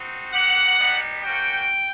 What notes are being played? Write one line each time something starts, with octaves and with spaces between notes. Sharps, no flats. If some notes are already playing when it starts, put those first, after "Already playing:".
Already playing: C4 D#4 F#4
A#3 D#4 G4 F#5
G3 B3 D#4
A#3 C#4 F#4 G5